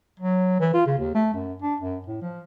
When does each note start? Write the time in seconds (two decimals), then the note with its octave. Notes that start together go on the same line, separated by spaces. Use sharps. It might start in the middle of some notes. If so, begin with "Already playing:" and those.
0.20 F#3
0.60 E3
0.74 F4
0.86 C#3
0.98 D#2
1.15 A3
1.34 F#2
1.62 D4
1.80 F#2
2.07 A2
2.22 F3